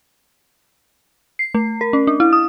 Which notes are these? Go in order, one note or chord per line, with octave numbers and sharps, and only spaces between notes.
C7
A3
A#4
C#4
D4
E4
D#6